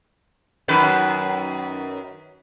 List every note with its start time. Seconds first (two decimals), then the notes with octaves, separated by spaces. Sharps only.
0.68 F#2 D#3 B4